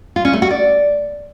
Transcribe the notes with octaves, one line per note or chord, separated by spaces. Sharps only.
F4
C#4
A3
F#4
D5